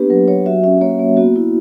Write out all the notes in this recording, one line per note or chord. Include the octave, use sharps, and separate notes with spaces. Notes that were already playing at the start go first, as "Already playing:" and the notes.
Already playing: A#3 B3 D4 G4 B4
F#3 B4
F#3 C#5
F#4 E5
C#4 E5
A#3 C#5
A#3
B3 F#4
E4